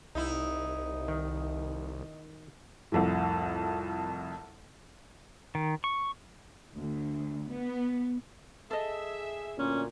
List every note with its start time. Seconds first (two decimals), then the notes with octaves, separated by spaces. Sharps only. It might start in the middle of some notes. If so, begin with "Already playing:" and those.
0.15 C2 D#4 E4
1.08 D#3
2.92 C2 F2 A2
5.55 D#3
5.84 C#6
6.76 D2
7.50 B3
8.71 G#4 A4 D#5 E5
9.58 D2 A#2 C#4